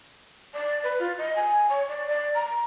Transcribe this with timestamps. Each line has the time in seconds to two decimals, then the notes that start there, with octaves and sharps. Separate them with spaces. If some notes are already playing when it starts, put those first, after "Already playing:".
0.54 D5
0.84 B4
0.99 F4
1.18 D#5
1.36 G#5
1.69 C#5
1.89 D5
2.08 D5
2.34 A#5